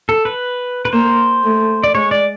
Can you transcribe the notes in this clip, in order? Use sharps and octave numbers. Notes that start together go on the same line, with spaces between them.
A4
B4
B4
A#3 C5
A3
D5
G#3 C#5
D5